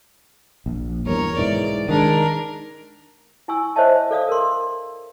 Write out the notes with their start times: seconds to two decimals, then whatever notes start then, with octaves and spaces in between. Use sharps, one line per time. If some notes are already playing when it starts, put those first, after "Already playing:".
0.66 A#1
1.06 E2 G2 A#4 C#5
1.37 B1 G#2 E3 D5
1.89 D#3 F#3 G#3 D4 A#4
3.48 E4 G#5 C#6 E6
3.76 C5 C#5 D#5 E5 A5
4.11 A4 D5 F5 D#6
4.29 A#4 C6